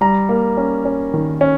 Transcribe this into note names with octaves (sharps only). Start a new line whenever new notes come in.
G3 A#5
A#3
C#4
C#4
D#3
C#4